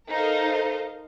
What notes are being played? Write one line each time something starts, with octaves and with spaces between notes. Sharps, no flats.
D#4 A4 A#4 C5 D#5 F5